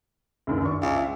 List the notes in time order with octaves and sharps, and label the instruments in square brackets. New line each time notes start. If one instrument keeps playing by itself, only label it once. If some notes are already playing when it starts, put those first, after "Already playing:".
[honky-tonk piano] C#2 F#2 D#3
G2 D5 C#6
[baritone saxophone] C#2
[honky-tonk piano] E5